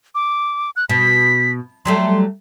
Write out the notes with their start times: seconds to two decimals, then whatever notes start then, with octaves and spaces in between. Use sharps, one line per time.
0.15 D6
0.76 F#6
0.89 B2 B6
1.85 F#3 G3 A3 C6